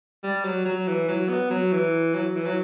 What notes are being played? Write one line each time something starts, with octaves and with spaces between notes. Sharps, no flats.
G3
F#3
F#3
E3
F#3
B3
F#3
E3
F#3
E3
F#3